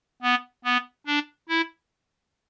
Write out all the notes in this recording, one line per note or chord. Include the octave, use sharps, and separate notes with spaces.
B3
B3
D4
E4